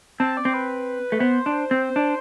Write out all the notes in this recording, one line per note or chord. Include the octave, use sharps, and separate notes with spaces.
C4 A5
D5
C4
B4
A3
B3 C5
D4
C4
D4